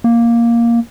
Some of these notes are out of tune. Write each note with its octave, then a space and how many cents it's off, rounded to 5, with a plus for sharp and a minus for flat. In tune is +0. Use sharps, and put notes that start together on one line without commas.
A#3 +5